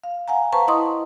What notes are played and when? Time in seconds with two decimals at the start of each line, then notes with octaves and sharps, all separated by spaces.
0.04 F5
0.28 F5 F#5 G#5 A#5
0.53 B4 C5 F5 A5 A#5 C#6
0.68 E4 D#5 C6 C#6 D#6